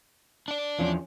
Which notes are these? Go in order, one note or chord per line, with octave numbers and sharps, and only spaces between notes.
D4 D5
E2 F3 C#4